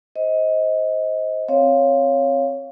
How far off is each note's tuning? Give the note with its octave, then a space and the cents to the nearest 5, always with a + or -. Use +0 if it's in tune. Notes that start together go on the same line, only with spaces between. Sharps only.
C5 +0 D#5 +25
C4 +0 C#5 +0 F5 +0